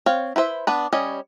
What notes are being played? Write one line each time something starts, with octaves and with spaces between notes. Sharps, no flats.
C4 C#5 F5
E4 B4 C5 E5
B3 D4 B4
G3 C#4 C#5 D#5